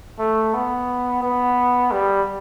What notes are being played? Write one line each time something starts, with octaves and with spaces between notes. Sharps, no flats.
A3
B3
B3
G3